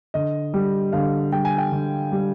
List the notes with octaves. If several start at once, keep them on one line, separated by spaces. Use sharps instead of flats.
D3 D#5
G3
D3 F5
G3 G5
G#5
G5
D3
G3